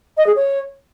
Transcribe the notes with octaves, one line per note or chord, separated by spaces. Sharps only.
D#5
G#4
C#5